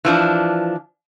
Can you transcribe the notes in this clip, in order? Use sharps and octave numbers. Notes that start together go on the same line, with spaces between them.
E3 F3 D4